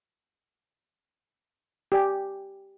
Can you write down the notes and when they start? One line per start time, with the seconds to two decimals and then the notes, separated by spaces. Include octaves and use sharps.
1.92 G4 D5 G#5